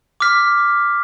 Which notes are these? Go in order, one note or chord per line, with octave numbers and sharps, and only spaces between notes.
D6 F6 B6